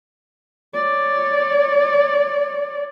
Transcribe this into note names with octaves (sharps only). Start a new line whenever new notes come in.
C#5 D5